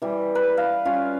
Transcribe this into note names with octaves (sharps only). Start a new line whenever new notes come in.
E3 G3
B4
F5
G3 C#4 F4